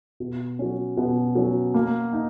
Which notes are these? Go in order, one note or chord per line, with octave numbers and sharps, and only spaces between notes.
B2
F#3 C#4
B2
F#3 C#4
A#3
D#4